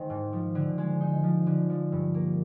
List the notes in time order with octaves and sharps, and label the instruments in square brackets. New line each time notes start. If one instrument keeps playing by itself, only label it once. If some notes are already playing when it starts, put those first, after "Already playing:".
Already playing: [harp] D#3 G#3 C4
G#2
F3
D3
G#3
D#4
F3
D3
F3
G2
A#3